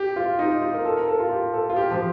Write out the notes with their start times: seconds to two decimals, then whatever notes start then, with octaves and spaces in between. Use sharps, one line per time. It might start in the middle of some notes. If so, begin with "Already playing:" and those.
Already playing: G4
0.16 F4
0.39 D#4
0.62 F4
0.74 A#4
0.85 A4
0.97 A#4
1.08 A4
1.20 F4
1.31 G4
1.54 A4
1.70 F4
1.76 G4
1.91 F3